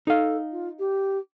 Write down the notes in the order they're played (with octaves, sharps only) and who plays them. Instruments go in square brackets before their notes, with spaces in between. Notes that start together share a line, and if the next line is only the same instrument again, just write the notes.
[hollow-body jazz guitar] D#4 F5 [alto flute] A4
[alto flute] F4
G4